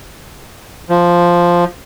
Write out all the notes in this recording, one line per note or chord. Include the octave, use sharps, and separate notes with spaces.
F3